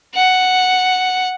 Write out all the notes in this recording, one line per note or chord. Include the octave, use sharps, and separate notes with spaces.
F#5